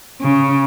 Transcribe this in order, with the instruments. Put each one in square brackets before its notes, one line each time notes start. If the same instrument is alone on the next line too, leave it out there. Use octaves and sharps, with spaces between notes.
[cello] C#3